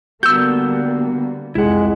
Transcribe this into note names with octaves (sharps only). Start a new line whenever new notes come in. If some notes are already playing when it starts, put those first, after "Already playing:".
D3 G3 A#3 B3 F#4 E6 G6
C2 F2 G#3 E4 F#5